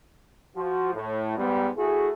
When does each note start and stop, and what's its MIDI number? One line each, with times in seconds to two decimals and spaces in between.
0.56 0.94 53
0.56 0.94 66
0.94 1.35 45
1.37 1.69 44
1.37 1.69 55
1.37 1.69 59
1.77 2.10 57
1.77 2.10 64
1.77 2.10 66
1.77 2.10 68